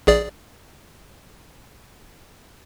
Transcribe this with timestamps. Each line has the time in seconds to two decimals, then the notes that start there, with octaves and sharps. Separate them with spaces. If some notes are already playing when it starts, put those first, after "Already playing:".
0.07 A#1 G#4 D5